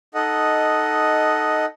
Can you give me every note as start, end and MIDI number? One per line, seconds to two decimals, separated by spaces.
0.15 1.65 63
0.15 1.65 69
0.15 1.65 75
0.15 1.65 78